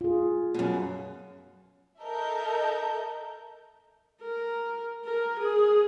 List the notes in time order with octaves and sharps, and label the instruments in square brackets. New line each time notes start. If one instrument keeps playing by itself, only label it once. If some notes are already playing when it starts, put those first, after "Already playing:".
[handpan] F4 G#4
[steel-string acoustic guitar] F#2 B2
[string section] A4 A#4 D#5 E5 A#5 G6
[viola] A#4
A#4
G#4